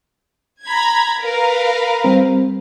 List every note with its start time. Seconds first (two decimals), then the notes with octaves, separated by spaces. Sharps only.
0.65 A#5 B5 G#6
1.21 A#4 B4 F5
2.04 G3 C4